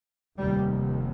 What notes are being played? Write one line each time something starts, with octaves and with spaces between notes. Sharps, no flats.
F1 D#2 G3